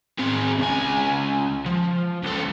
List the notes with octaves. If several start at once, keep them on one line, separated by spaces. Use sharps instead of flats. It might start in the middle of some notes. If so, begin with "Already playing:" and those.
C4 G#4
C#2 G#5
F3
C#2 A4